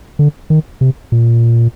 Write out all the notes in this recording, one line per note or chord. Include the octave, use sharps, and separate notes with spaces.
D3
D#3
C3
A#2